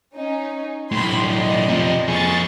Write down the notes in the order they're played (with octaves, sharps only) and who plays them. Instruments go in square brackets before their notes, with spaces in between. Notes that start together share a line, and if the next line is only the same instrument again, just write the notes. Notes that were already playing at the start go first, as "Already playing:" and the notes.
[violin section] C#4 D#4
[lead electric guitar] B1 A2 [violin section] B5 C6
[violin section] D5 D#5 C6
[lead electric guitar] C3 F3
[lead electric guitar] F2 G#4 [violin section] C#6 A6